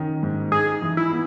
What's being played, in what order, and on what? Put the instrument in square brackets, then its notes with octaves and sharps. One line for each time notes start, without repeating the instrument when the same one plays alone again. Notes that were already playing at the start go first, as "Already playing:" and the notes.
Already playing: [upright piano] D#3 C#4
G#2
[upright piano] D#4 [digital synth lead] G#4
[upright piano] E3
[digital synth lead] E4
[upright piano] B3